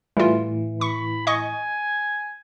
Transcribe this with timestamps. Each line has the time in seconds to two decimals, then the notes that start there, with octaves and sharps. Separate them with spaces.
0.17 A2 E3 G3 F4
0.81 B5 C#6
1.27 D#5 G#5 C#6